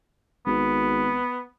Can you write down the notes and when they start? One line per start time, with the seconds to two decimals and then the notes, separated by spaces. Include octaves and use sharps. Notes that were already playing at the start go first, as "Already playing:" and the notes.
0.46 G#1 B3